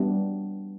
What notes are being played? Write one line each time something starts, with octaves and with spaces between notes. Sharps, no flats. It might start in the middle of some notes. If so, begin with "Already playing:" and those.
Already playing: G3 B3 D4